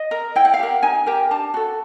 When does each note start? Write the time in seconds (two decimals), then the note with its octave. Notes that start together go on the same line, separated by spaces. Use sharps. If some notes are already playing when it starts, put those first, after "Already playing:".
Already playing: D#5
0.11 A#4
0.36 E4 G5
0.45 F#5
0.54 F5
0.59 G4 A#4 F#5
0.83 D#4 G#5
1.06 G4 A#4
1.31 D4 A5
1.54 F#4 A4